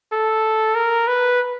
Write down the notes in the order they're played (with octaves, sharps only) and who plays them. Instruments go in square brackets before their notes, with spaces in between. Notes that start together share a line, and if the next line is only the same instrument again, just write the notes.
[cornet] A4
A#4
B4